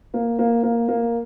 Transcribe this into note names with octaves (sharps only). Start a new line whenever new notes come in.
A#3
A#3
A#3
A#3